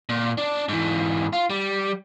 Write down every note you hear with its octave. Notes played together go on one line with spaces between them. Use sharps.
A#2
D4
G#2 E3
F4
G3